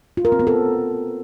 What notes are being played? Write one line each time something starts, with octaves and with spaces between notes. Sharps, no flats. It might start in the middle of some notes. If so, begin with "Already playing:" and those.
F4
A#4
C4
B3
A4